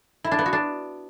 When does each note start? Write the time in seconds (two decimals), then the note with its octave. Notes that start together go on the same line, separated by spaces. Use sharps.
0.24 E4
0.32 D4
0.39 B3
0.46 F#4
0.53 D4